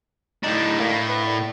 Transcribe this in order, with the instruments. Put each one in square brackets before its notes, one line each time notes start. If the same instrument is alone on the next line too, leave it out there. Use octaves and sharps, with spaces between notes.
[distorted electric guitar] A2 D4 [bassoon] D#4
[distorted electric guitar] A2 [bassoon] A#3
[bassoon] B4
D3